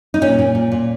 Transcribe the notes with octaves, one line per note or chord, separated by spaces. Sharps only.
D#4
A#2 C#4
A#2
A#2
A#2